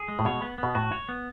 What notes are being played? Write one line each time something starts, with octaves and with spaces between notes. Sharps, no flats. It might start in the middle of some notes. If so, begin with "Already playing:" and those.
Already playing: G#4
G#3
A2
B2 C#5
B3
B2 B3
A2 F#4
C#5
B3